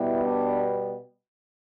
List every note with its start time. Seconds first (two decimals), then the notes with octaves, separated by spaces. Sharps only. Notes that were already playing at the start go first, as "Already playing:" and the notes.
Already playing: B2 G3 B3 E4
0.25 D4